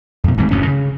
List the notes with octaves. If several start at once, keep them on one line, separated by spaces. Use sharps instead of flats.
F2 B2
D1 G#2 E3 C4
F#1 D2 A2 C#4
C#3